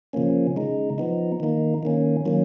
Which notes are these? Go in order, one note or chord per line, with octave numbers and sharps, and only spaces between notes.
C#3 F3 A#3 C#4
C#3 G#3 D#4
F3 B3 D#4
D#3 A#3 D#4
D#3 A#3 C#4
D#3 F#3 A#3 C#4